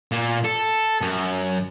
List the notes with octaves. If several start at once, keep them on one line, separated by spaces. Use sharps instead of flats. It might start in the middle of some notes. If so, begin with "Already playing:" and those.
A#2
A4
F#2